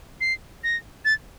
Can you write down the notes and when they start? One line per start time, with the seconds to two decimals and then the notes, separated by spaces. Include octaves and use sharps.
0.21 C7
0.64 A#6
1.05 A6